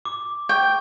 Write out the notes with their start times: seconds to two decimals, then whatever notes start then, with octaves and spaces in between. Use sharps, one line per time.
0.05 D6
0.49 G5 C#6